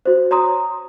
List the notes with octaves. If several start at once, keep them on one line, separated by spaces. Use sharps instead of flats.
F#4 C5
C#5 A#5 C6 D#6